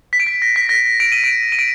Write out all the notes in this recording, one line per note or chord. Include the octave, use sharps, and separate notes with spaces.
B6
D7
B6
A#6
B6
A#6
D7
D#7
D7
D#7
D7